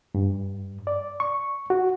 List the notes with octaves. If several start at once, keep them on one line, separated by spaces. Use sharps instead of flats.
G2
D5
C#6
F#4